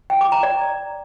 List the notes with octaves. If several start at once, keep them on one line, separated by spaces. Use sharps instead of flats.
G5
D6
A#5
D5